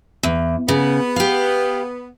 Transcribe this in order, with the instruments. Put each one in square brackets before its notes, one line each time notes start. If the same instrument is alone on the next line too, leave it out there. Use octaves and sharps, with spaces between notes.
[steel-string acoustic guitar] E2
[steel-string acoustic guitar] C#3 [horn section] B3
[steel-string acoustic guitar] G4 F5